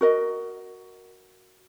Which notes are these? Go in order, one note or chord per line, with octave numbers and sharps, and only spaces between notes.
F#4 A#4 D#5